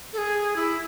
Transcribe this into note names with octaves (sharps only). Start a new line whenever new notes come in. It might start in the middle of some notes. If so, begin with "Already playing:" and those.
A4
G#4
E4